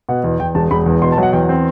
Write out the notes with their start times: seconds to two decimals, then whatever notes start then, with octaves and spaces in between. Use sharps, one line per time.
0.09 B2 F#5
0.24 E2
0.40 E2 G5
0.55 E1 A5
0.71 E1 B5
0.86 E2
1.02 B2 C6
1.12 A5
1.18 F#3 F#5
1.33 E2 G5
1.49 C4